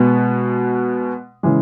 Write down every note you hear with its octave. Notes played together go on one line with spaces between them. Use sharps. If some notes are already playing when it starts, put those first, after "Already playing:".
Already playing: B2 G#3 B3
C#3 E3 G#3